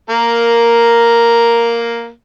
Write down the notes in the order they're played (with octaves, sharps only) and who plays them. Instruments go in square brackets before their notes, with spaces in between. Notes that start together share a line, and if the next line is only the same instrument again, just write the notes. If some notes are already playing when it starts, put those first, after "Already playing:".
[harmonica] A#3 A#4